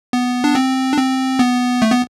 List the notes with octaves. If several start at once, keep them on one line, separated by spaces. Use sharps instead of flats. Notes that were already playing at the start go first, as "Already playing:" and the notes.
B3
D4
C4
D4
C4
B3
A3
B3